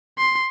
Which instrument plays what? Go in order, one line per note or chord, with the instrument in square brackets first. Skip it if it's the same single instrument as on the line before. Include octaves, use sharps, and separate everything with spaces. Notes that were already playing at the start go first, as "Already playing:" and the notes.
[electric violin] C6